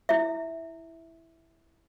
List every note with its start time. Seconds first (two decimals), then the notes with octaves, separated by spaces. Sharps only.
0.09 E4 E5